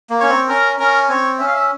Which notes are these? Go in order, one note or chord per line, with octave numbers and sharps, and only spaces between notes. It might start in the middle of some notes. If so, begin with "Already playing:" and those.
A#3
C#4 C#5
C4
C#4 A#4
C#4 A#4
C4 C#5
C#4 E5
F5
E5